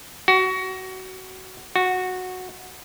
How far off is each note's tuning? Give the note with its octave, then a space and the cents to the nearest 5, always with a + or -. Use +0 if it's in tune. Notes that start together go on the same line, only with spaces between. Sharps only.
F#4 +20
F#4 -10